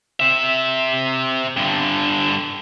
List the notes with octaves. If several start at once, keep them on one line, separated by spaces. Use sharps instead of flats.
C3 E5
G2 D3